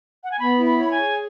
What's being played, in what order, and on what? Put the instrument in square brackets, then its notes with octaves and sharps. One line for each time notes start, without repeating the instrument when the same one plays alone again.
[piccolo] F#5
G#5
[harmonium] B3 [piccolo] B5
[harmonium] E4
[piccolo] B5
[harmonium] C#5
[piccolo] B5
G#5
[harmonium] G#4